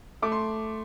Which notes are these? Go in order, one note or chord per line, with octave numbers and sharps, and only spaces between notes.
A3 D6
C6